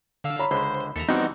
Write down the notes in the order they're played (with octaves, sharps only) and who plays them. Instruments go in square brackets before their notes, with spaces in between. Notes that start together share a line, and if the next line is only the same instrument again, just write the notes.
[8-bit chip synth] D3 F5 E6
[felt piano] C#5 A#5 B5
[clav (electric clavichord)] C#2 D3 G#3 [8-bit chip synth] C5 [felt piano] B5
[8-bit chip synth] D#2 [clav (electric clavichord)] A4 E5 A#5
[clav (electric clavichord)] E3 F3 [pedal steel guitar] G3 B3 D#4 [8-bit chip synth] C4 F#4